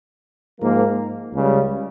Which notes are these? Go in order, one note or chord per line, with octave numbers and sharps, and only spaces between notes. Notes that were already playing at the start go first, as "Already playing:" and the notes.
G#2 F3 A#3
C#2 C#3 G3